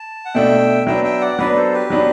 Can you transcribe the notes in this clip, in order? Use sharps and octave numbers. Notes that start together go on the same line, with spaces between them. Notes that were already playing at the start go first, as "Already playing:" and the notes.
Already playing: A5
F#5
B2 A3 D4 E5 G5
F#3 B3 D4 E5 G5
E5 G5
D5 F#5
F#3 B3 D4 B4 D5
A4 C5
G4 B4
F#3 B3 D4